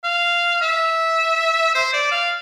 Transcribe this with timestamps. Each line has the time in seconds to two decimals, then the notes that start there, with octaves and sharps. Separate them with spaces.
0.04 F5
0.61 E5
1.75 C5
1.93 D5
2.11 F5